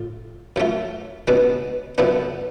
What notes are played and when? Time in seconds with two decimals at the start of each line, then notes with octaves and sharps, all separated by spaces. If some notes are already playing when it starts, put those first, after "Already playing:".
Already playing: A2 F4
0.56 F#2 F3 A3 F4
1.28 C#2 B2 G#3 B3 D4
1.98 F#2 D3 F3 B3 D4